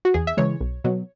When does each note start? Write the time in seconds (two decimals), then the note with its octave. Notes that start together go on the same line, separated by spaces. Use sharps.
0.05 F#4
0.14 E2 G#4
0.27 E5
0.37 C#3 E3 G#3 C#5
0.61 B1
0.84 B2 F#3